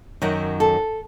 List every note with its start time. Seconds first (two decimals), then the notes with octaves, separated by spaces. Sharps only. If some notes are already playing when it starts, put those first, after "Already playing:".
0.22 F#2 D#3 F#3 F#4
0.60 A4